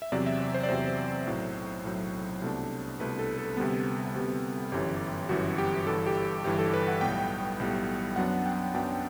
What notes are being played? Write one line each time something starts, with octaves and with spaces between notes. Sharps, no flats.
E5
E2 C3 F#3 C4 D5
E5
D5
C5
D5
E2 C3 F#3 C4 C5
B1 A2 F#3
B1 A2 F#3
C2 B2 A3 D4
C2 B2 A3 D4 B4
A4
A4
D2 C3 G3 B3
D2 C3 G3 B3
G1 F#2 E3 G4
G1 F#2 E3 F#4
G4
G1 G2 E3 A4
G4
G1 G2 E3 G4
A4
B4
F#5
B1 A2 G3 B3 G5
B1 A2 G3 B3
F#2 F#3 B3 D4 F#5
G5
F#2 F#3 B3 D4 G5